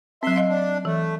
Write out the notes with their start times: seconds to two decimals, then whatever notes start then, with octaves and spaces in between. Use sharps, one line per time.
0.23 F#3 C4 E5 C6
0.36 D#5 F5
0.49 D4
0.85 E3 A3